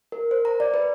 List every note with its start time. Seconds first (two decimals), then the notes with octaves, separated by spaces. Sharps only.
0.12 A#4
0.31 C5
0.45 A#5
0.60 D5
0.74 B4